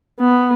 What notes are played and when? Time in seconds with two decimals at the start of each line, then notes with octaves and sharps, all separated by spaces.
0.20 B3